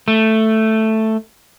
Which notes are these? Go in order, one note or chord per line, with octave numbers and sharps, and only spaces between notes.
A3